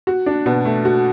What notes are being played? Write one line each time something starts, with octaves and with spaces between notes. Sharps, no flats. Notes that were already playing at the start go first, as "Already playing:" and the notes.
F#4
D4
B2
A3
F#4